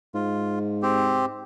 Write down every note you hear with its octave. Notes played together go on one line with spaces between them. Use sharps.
G#2 F4
C4 G4